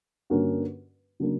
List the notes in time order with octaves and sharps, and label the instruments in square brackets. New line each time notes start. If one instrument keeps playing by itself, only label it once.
[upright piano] G2 D3 A#3 C#4 F#4
C#3 F#3 A#3 D4